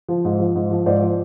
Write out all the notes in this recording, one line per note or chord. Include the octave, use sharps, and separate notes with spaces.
F3
G#2
F3
G#2
F3
G#2 C5 D5
F3